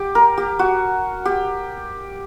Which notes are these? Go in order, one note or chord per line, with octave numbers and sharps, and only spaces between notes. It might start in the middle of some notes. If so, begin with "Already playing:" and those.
Already playing: G4
A#4
G4
F#4
G4